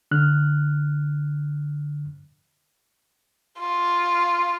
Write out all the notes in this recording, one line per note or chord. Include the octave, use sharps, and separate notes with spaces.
D3 F6 F#6
F4